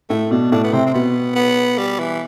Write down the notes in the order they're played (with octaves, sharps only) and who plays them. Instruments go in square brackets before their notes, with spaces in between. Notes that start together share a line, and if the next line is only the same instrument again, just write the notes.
[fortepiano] A2 [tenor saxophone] A3
[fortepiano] B2 [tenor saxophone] D4
[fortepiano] A2 [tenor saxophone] D4
[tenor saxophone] B3
[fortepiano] C3 [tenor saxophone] C4
[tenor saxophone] C4
[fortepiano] B2 [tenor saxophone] B3
[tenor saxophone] B3
G3
E3